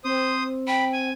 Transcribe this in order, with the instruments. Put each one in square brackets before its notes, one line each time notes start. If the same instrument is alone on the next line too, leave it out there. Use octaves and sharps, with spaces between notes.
[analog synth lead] C4 [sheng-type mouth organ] C5 D#6
[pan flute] G5 [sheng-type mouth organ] B5
[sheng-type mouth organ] G#5